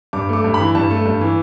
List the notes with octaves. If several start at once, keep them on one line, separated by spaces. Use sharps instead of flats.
G2 D6
A3 D6
G2
B5
E3
G2 A5
A3
G2
E3